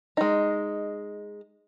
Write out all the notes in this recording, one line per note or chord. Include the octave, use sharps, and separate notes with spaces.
G#3 D#4